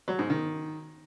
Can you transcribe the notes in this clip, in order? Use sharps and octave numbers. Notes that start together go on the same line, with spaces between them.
F#3
G#2
D#3